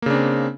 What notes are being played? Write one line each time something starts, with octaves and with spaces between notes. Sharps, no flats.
C#3 A#3 C4 D4